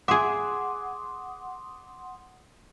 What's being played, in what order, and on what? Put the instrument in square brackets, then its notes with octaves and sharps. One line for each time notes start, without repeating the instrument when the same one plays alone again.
[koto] G#4 E5 [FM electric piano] F#5 C6 D#6 [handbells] D6